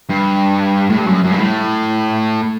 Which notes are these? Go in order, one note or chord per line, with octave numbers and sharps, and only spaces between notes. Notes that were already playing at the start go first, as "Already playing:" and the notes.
G2
A2
G2
F#2
F#2
G2
A2